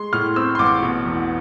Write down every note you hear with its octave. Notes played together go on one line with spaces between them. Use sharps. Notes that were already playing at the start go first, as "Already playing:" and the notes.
Already playing: G#3 C6
A2 F6
C4 E6
C6
A1 D6
B2
E2